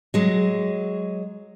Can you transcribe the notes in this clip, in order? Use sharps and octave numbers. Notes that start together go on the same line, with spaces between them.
F#3 G#3